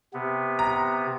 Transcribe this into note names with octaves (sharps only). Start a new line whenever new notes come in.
C3 B3
A#5